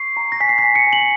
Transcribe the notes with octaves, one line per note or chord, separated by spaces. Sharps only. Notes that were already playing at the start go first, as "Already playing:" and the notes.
Already playing: C#6 C7
A#5
A#6
G#5 B6
C7
B6
G#5
C#7
G#5
F#7